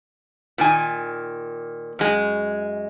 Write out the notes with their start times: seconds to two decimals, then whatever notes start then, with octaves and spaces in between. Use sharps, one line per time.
0.58 A#2 D#3 G#5
1.99 F#2 G#3